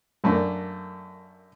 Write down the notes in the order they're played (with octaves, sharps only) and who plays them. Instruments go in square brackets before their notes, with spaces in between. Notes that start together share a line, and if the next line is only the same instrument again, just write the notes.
[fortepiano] F#2 A3 A#3 D4